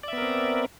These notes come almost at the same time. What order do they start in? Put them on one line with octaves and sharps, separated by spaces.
D5 E5 B3 A#4 C4